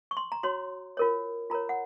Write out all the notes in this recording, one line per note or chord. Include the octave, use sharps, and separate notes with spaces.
C#6
C6
A#5
F#4 C#5 C6
F4 A#4 C#5
F4 A#4 C#5 A#5
F#5